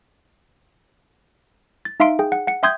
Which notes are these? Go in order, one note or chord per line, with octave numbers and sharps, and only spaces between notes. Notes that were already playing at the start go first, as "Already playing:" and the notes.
A6
D#4 E5 F5 C6 D7
G#4 G5
F#5
F#5 C#7
E5 G5 C6 D#6 G6 G#6